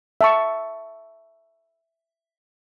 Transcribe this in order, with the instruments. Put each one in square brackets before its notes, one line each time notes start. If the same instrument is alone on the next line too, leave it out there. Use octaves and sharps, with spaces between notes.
[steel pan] E5 A5 C#6